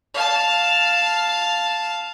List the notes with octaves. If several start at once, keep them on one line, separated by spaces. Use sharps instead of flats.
F5 A5